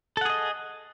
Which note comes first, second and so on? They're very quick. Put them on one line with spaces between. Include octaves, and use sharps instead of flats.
A4 F#5 G#4 D#5